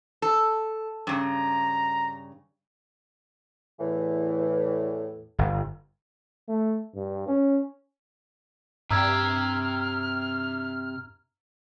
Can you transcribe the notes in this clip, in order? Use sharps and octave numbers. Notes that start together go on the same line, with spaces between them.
A4
G2 C#3 A#5
E2 A2 E3
G1
A3
G2
C#4
G2 C3 G4 A#5 E6 F6 G#6